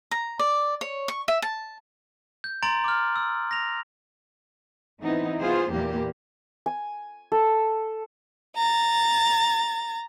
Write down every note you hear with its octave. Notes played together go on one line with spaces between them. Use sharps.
A#5
D5
C#5
C#6
E5
A5
G6
A#5 C6 A6 D7 F#7
D6 F6
E6
A#6 F7
E3 B3 C4 D#4 E4
B3 F4 G#4 C5
E2 A#2 E3 A#3 G4
G#5
A4
A#5 A6